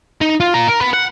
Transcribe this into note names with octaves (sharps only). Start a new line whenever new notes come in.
D#4
F4
F4 A#5
A#4
B3 B4
F#5